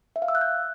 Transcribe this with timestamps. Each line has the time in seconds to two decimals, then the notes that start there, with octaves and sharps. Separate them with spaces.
0.16 E5
0.22 F5
0.28 E6
0.35 F#6
0.41 G6